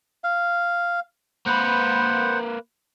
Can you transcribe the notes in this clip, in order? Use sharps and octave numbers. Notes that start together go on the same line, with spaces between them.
F5
A#3 B4 C5 F#5